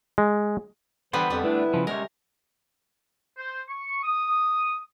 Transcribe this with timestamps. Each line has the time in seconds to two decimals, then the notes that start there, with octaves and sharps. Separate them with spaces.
0.18 G#3
1.13 D3 E3 G3 B3 B4 C5
1.30 F2 G3
1.44 A3 D4 E4 B4
1.74 C#3 F3
1.87 C3 G#3 C#4 A#4 C#5
3.37 C5
3.69 C#6
4.03 D#6